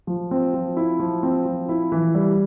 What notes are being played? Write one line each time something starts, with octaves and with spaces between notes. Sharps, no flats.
F3
C4
F3
E4
F3
C4
F3
E4
E3
G3